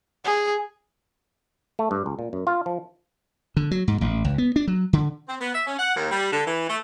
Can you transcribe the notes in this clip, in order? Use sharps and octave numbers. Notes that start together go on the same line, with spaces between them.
G#4
A3
G2
C#2
A#2
F#2
F4
F3
D3
F#3
G#2
A1
C#2
B3
D4
F#3
D3
C4
B3
E5
C#4
F#5
D#2
G3
D3
E3
A3